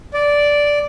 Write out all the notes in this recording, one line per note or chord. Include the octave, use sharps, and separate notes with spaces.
D5